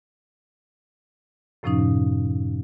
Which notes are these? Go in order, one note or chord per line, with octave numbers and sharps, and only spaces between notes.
F#2 A2 C3 F3 C#4 D#4